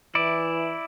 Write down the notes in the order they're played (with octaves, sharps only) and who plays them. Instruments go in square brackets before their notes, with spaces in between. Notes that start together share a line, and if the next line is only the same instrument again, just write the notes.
[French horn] E3 [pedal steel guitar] E4 D5